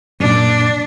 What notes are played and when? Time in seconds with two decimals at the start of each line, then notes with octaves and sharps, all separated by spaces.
0.20 F#2 A#2 D4